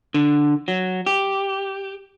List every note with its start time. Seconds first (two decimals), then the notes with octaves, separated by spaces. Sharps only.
0.14 D3
0.68 F#3
1.06 G4